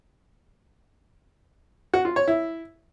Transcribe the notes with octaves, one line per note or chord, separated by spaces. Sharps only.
F#4
F4
C#5
E4